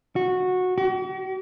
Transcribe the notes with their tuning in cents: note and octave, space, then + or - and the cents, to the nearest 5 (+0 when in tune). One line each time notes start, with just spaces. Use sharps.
F#4 -15
F#4 +45